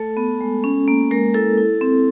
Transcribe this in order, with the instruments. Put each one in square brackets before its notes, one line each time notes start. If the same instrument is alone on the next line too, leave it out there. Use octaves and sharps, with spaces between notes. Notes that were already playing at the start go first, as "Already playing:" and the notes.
Already playing: [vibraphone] A3 A4
B3
G#3
C#4
A#3
G#3 A#4
E4 A4
E4
C4